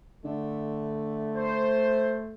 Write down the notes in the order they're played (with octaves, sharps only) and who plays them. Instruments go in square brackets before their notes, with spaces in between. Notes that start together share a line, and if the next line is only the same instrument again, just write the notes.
[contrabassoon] D3 [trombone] A3
[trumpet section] C5